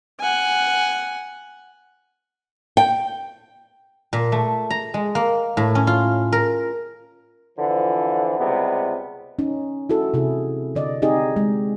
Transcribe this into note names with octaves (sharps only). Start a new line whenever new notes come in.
F#5 G#5
G5
A#2
A3
A#5
G#3
A#3
A2
C#4
F4
A#4
D3 E3 F3
C#2 C3 G3 B3
C#4 D#4
E4 F#4 A4
C3 E4 G#4
D3 D5 D#5
C4 D#4 G4 G#4 D#5
G#3